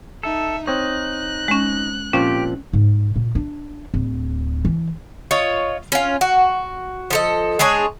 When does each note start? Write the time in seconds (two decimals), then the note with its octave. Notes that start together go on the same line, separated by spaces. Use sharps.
0.23 D#4 A4 E5
0.67 C4 D#4 C#5 F#6
1.48 G#3 C#4
2.13 A#2 F3 C4 C#4 G4
2.73 G#2
3.16 A#2
3.35 D4
3.94 D1
4.65 E3
5.31 F4 C#5 D#5
5.92 C#4 F4
6.21 F#4
7.10 F3 A4 D#5
7.59 G#3 D4 G#4 C#5